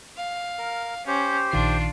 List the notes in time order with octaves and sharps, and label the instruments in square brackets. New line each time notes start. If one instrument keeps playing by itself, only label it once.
[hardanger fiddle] F5
[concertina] A#4
[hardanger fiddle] C#4 [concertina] G4 C5
[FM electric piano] A#1 D#3 C7 [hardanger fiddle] D4 F4